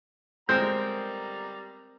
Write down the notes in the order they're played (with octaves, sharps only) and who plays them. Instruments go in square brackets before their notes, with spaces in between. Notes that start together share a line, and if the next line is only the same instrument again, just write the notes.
[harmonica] G3 A#5 [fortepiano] G#3 C5 [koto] C4 A#4 [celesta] G6